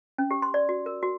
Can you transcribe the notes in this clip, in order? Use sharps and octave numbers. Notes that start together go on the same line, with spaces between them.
C#4
G4
C6
D5
F#4
A#4
F#4